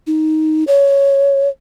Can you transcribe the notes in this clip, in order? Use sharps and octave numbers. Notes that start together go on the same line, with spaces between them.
D#4
C#5